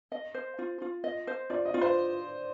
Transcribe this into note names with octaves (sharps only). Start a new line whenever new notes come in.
D#5
C5
F4
F4
D#5
C5
F4 D5
D#5
F4
C5